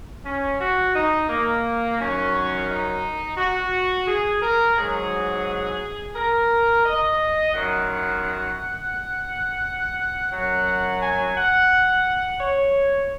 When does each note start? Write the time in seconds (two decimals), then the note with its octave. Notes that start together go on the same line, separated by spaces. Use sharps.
0.25 C#4
0.60 F#4
0.94 D#4
1.29 A#3
1.99 F#2 D#3 F#3 C#4
2.69 D#4
3.37 F#4
4.07 G#4
4.42 A#4
4.76 G#2 F#3 G#4
6.15 A#4
6.85 D#5
7.54 F#2 D#3 F#3 F#5
10.31 F#2 F#3 F#5
11.01 G#5
11.36 F#5
12.40 C#5